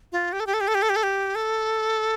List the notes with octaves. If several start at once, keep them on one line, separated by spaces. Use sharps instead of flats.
F4
G4
A4
G4
A4
G4
A4
G4
A4
G4
A4
G4
A4